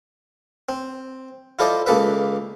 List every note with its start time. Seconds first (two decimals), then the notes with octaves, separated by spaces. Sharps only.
0.69 C4
1.59 E4 F4 A4 C5 D5 D#5
1.86 C#2 A#3 A4 B4 E5